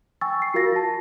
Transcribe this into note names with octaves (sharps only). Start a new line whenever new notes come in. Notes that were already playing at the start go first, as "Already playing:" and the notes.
G5 G#5 C#6 E6 A6
C7
F4 F#4 A#4 F5 A6 A#6
A5